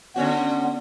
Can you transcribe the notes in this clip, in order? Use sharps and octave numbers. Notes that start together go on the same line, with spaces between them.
D3 B3 C#4 F#4